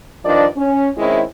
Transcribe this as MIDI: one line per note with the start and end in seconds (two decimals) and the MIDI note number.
0.24 0.45 43
0.24 0.45 51
0.24 0.45 53
0.24 0.45 62
0.24 0.45 74
0.24 0.45 75
0.56 0.88 61
0.97 1.21 51
0.97 1.21 56
0.97 1.21 60
0.97 1.21 61
0.97 1.21 64